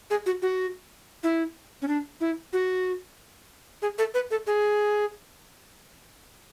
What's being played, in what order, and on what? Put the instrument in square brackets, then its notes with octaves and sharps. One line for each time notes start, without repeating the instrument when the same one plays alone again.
[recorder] G#4
F#4
F#4
E4
C#4
D4
E4
F#4
G#4
A4
B4
A4
G#4